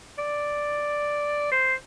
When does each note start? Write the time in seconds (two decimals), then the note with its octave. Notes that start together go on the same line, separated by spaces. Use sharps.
0.18 D5
1.51 C5